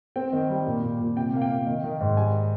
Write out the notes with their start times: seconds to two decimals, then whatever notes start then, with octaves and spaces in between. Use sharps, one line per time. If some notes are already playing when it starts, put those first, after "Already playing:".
0.16 C4 G5
0.33 D#3
0.49 G3
0.66 A#2
0.83 A#2
0.99 A#2
1.16 C3 G5
1.33 A#3 F5
1.42 G5
1.50 A#3
1.67 D#3
1.84 D#3
2.01 G#2
2.16 G3 G#5